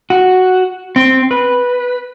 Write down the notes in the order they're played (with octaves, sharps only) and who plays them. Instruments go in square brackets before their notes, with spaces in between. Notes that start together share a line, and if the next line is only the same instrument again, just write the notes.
[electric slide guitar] F#4
C4
B4